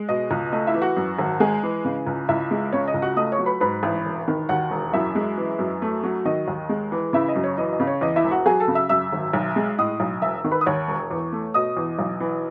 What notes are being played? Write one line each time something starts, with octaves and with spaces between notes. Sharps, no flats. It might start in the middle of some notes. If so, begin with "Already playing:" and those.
Already playing: G#3
B2 D#5
C#2
A3 D#5
E4 E5
E3
F#4 F#5
F#2
G#1
G#3 G#4 G#5
E3
C#3
C#2
C#2 E4 E5
G#3
C#3 C#5
D#5
C#2
F#4 F#5
A3 D#5 D#6
C#5 C#6
F#3
B4 B5
G#2 B4 B5
A1
E1
D#3
D#2 F#4 F#5
E1
F#2 E4 E5
G#3
E3
F#2
A3
F#3
D#3 D#5
D#2
G#3
E3
C#3 E4 E5
D#5
F#2
C#5
E3 D#5
D#5
C#3
C#5
E2 D#5
E4 E5
E1
F#4 F#5
F#3 G#4 G#5
A4 A5
C#3
E5 E6
F#2 E5 E6
G#1
B1
G#3
A2 D#5 D#6
B1
E1 E5 E6
D#3
B4 B5
D#6
D#2 C#5 C#6
E1
E2
A3
B2 D#5 D#6
E2
B1
E3